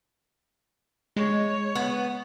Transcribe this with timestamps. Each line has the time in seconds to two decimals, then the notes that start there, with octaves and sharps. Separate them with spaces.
1.16 G#3 C#5
1.75 B3